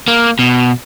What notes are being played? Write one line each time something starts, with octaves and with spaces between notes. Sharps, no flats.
A#3
B2